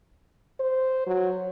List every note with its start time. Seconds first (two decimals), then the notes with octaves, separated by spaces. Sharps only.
0.60 C5
1.07 F#3